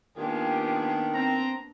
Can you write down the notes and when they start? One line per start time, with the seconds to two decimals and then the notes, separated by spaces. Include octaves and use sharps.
0.17 D#3 A#3 B3 D4 F4 G4 G#4
1.14 C4 A#5